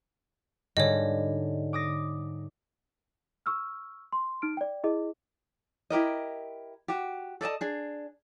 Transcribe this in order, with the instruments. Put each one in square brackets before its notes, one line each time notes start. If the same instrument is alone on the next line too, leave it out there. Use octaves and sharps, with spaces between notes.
[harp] G#2 D3 G3 [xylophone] C#5 D#5
[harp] D6 D#6 A#6
[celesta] C#6 E6 F6
C6
D#4 F6 D7
D5 G5
E4 G#4 D#5
[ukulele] E4 G4 A#4 D#5
F#4 G4
A4 D5 D#5 A5
D4 G#4